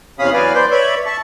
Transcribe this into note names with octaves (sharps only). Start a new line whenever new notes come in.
E2 C3 C#4 F5 B5 D#6
E2 F#3 B4 D5 F5 G#5
B4 C5 D5 G5 C6
B4 C#5 D5 E5 B5
E5 A5 C#6